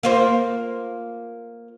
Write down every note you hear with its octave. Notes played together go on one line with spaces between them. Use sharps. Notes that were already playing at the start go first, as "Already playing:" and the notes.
A#3 F4 C5